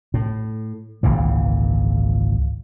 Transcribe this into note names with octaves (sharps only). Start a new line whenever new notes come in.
A2
G#1 C#2 A#2 E3